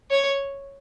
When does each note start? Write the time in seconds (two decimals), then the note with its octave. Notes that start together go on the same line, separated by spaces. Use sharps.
0.11 C#5